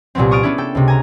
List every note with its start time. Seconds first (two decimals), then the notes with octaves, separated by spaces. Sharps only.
0.15 C2 A#2 F#3 B3 C4
0.31 C#6 D#6 F6 A6 D7
0.43 B3 C#4 D4 E4 G#4
0.58 A4 G5
0.75 C#2 C3
0.88 G#5 A#5